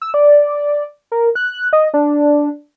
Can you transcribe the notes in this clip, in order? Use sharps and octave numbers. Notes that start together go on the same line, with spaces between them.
E6
D5
A#4
F#6
D#5
D4